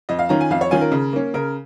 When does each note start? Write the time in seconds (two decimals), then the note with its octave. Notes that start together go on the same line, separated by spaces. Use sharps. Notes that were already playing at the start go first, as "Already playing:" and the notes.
0.09 F2 D#5
0.19 F5
0.29 D#3 C#4 F4 A#5
0.41 G#5
0.50 F2 F5
0.61 C#5
0.71 D#3 C#4 F4 G#5
0.81 A#4
0.92 C#3
1.13 A#3 C#4
1.34 C#3 A#4